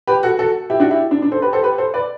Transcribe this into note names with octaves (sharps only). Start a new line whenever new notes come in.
G4 B4
F#4 A4
F#4 A4
E4 G4
D4 F#4
E4 G4
D4
D4
A4 C5
G4 B4
A4 C5
G4 B4
A4 C5
B4 D5